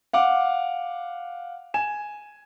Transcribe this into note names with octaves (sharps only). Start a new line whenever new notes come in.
F5 F#5 D6
G#5 E7